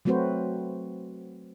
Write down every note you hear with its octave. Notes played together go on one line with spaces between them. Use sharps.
F#3 A3 C4 F#4 B4 C5